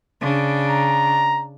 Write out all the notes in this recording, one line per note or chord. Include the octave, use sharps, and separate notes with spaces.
C#3 D4
A#5